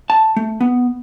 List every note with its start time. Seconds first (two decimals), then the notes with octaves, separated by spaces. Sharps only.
0.10 A5
0.36 A3
0.61 B3